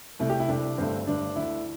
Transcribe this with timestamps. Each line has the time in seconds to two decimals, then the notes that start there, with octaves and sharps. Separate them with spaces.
0.19 C2 C3 A3 E4
0.30 G4
0.40 E4
0.48 C2 C3 A3 D4
0.78 G1 G2 D3 A3 C4
1.07 G1 G2 D3 A3 D4
1.36 D2 D3 A3 E4